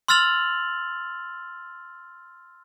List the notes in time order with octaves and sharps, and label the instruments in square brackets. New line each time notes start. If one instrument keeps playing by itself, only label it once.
[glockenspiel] C6 E6 F6 A6 F7 F#7